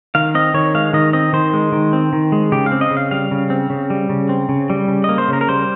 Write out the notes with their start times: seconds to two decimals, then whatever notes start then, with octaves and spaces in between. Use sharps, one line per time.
0.15 D#3 F5
0.35 C4 D#5
0.54 D#3 C#5
0.75 G#3 F5
0.93 D#3 D#5
1.13 C4 D#5
1.33 D#3 C5
1.53 G#3
1.72 D#3
1.93 C4
2.13 D#3
2.32 G#3
2.52 C#3 G4
2.66 F5
2.72 C4
2.81 D#5
2.91 C#3
2.97 F5
3.11 G3 F5
3.31 C#3
3.50 C4
3.70 C#3
3.90 G3
4.09 C#3
4.29 C4
4.49 C#3
4.70 G3
4.88 C#3
5.04 A#3 D#5
5.18 C5
5.28 C#3 A#4
5.41 A#4
5.49 G3 C5